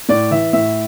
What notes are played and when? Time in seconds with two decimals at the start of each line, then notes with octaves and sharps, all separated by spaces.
0.09 A2 D5
0.31 E3 E5
0.53 A2 E5